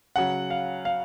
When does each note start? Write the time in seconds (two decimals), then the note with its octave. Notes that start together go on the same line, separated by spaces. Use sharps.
0.16 C#3 F#3 F#5
0.50 F5
0.85 F5